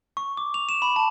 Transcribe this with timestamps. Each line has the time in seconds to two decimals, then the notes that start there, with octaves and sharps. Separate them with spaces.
0.17 C#6
0.37 D6
0.54 F7
0.69 E7
0.82 B5
0.96 A5